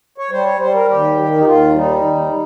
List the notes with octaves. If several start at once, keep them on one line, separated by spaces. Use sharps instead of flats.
C#5
G3 C5
C#5
G3 C5
A#4
D#2 G4
D#3
D#4
D#2 F4
G3 D#4
D#2